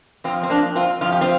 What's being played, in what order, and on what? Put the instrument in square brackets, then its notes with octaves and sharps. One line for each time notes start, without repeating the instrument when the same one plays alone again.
[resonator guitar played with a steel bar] F2 F3 C4 F4
C4
A#3 D4
C4 F4
F2 F3 F4
G4
C4 F4